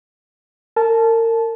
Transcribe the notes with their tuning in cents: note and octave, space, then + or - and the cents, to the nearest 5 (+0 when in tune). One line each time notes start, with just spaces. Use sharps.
A#4 -35 A5 -20